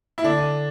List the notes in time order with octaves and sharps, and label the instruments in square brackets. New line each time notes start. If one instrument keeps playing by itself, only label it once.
[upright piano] E4
[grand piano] D3 [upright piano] D4